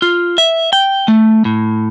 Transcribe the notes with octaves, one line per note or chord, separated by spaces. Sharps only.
F4
E5
G5
A3
A2